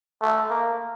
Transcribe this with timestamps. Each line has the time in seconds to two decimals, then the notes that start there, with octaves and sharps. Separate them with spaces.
0.21 A3
0.50 A#3